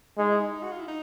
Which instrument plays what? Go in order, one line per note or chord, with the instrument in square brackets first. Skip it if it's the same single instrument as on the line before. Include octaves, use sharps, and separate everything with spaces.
[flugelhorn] G#3 [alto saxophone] D#4
[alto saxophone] E4
D#4
F#4
F4
E4
D#4